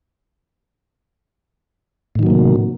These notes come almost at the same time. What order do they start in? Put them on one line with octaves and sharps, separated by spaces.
A2 D#3 F#3 A#3 C3